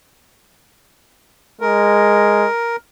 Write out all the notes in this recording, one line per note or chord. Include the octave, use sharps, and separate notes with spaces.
G#3 A#4